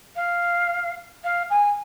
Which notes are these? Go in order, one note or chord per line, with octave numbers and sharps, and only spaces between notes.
F5
F5
G#5